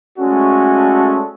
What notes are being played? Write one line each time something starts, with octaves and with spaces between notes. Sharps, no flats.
G#3 A3 C#4 F#4 A4 D5